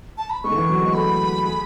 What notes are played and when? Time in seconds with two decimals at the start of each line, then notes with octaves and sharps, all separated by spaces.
0.18 A5
0.30 B5
0.44 G#3 C#6
0.51 D3
0.56 E3
0.69 F#3
0.81 G#3
0.94 A3 B5
1.45 G#4